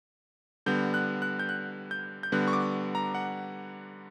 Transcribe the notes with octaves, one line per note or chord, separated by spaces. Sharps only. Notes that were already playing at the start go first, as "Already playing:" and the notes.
D3 G3 B3 G6
F#6
F#6
G6
F#6
G6
G6
D3 G3 B3 F#6
C#6
D6
A#5
F#5